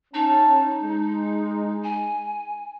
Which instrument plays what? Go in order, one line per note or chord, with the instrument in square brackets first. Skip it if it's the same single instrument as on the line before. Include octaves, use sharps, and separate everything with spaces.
[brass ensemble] C#4 A5 [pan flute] D#4
[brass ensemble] G#3
[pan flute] G#5